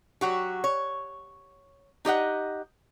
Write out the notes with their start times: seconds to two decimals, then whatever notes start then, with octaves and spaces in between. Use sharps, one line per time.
0.21 F#3 F#4 G4
0.64 C#5
2.05 D#4 G4 D#5 F#5